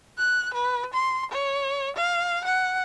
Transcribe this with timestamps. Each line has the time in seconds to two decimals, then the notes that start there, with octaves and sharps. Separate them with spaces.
0.18 F#6
0.54 B4
0.94 C6
1.32 C#5
1.96 F5
2.45 F#5